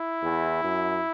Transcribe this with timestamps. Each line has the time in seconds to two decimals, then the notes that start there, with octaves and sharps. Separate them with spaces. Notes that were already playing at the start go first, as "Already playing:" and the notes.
Already playing: E4
0.22 E2
0.64 F#2